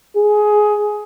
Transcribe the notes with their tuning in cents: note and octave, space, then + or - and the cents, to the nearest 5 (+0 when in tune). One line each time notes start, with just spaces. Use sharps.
G#4 +15